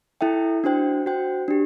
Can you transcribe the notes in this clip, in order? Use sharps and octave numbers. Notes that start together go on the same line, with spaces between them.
E4 A4 E5 G5
D4 F#4 C5 G5
F#4 C5 G5
D4 G4